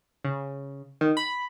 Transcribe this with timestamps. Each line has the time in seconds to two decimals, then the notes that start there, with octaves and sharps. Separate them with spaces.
0.24 C#3
1.01 D#3
1.17 B5